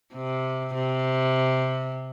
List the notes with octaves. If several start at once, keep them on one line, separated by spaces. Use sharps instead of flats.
C3
C3